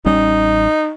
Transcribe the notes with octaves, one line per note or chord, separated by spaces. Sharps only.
A1 G3 C#4 D#4